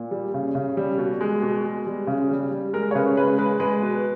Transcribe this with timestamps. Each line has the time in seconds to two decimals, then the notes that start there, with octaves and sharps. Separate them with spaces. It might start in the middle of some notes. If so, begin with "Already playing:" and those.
Already playing: A#2
0.11 G3
0.34 C#3
0.55 C#3
0.77 G3
0.98 B2
1.21 G#3
1.42 B2
1.64 G#3
1.87 G3
2.07 C#3
2.30 G3
2.51 G3
2.73 G#3 A#4
2.91 C#5
2.95 C#3 B4
3.16 G#3 B4
3.38 G#3 B4
3.60 G#3 B4
3.82 B2